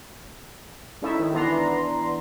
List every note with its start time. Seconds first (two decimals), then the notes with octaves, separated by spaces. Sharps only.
1.02 G#3 C#4 D#4 E4 A4 E5
1.19 D#3
1.33 E3 B3 D4 A#5 C6